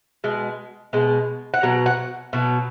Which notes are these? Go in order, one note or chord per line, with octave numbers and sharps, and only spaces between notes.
B2 G#3
B2 G#3
F#5
B2 F#3
F#5
B2 F#3